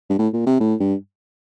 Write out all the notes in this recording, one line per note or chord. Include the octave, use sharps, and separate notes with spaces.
G2
A2
A#2
C3
A2
G2